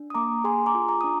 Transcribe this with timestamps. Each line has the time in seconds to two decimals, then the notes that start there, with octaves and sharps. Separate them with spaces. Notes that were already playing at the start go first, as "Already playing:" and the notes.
Already playing: D4
0.10 D#6
0.14 A#3 A#5 D6
0.44 G#4 G#5 C6
0.66 A#5 D6
0.75 F4
0.88 A#5 D6
1.01 D4 D#6